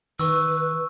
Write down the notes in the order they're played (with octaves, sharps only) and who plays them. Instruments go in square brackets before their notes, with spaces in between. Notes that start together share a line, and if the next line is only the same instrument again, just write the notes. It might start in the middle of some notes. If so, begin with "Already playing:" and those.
[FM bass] D#3 [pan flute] B4 [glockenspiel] C#6 E6